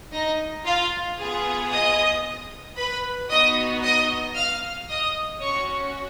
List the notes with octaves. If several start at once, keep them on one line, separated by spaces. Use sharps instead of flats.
D#4 D#5
F4 F5
B3 F4 G#4
D#5 D#6
B4 B5
B3 D#4 F#4 D#5 D#6
D#5 D#6
F5 F6
D#5 D#6
C#4 F#4 C#5 C#6